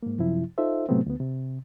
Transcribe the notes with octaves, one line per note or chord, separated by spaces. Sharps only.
G#2 A#3
F#2 C3 F3 E4
D#4 F4 A4 C5 E5
A2 C3 F#3 A3 B3 C4
D2 B3
C3